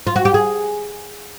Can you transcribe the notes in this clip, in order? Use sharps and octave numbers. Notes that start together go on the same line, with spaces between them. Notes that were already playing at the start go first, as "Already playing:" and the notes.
F4
F#4
G4
G#4